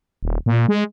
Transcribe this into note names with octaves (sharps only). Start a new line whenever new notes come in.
D#1
A#2
G#3